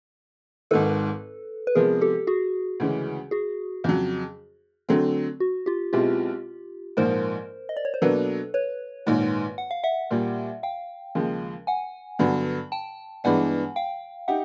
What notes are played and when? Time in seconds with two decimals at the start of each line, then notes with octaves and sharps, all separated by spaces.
0.71 G#1 G#2 D#3 A4 B4
1.67 B4
1.75 C3 F3 G#3 B3 G#4 A#4
2.01 G4 A4
2.27 F#4 G#4
2.80 D2 C#3 E3 G#3 C#4
3.31 F#4 G#4
3.84 F2 C#3 F#3
4.89 D3 F#3 A3 C4
5.40 F#4
5.66 F4 G4
5.93 B1 B2 G#3 C4 E4 F4 G4
6.97 A#1 G#2 F3 A#4 C5
7.69 D#5
7.77 D5
7.85 C#5
7.94 C5
8.02 B2 F#3 A#3 D4 A4 B4
8.54 B4 C#5
9.06 A#1 G#2 D#3
9.58 F#5
9.71 F5
9.84 E5 F#5
10.11 A#1 A#2 G3 A#3
10.63 F5 G5
11.15 D#2 C#3 F3 G#3
11.67 F#5 G#5
12.19 G2 D3 F#3 B3
12.72 G5 A5
13.24 G2 E3 G#3 B3 D4 F#5 G#5
13.76 F5 G5
14.28 D#4 G4 E5 F#5